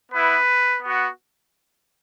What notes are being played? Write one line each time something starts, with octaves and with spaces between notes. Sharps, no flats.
B3 E4 B4
B3
F#4